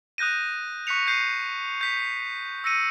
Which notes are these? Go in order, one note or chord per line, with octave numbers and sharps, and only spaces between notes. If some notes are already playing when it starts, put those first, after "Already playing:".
D#6 F#6 G6 A#6 D#7
C#6 F#6 B6 C#7 F7
G6 C7 D#7
G6 B6
E6 A#6 C#7 D#7